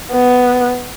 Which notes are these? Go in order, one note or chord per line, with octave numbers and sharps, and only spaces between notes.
B3